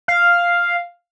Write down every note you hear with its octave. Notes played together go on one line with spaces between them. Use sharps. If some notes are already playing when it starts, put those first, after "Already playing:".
F5